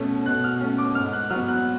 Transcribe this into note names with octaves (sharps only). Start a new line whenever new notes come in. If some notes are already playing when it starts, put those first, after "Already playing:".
Already playing: B2 A3 C#4
B2 F#6
F6
A3 C#4
D6
G#2 F6
F#6
F#3 B3 F6
F#6